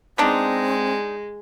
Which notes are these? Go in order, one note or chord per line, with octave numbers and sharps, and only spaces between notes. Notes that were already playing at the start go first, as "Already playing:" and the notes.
G#3 B3 C4 D4 D#4